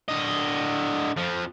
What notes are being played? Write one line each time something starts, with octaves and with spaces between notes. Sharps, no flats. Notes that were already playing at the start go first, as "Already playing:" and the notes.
D3 D#5
F2 F3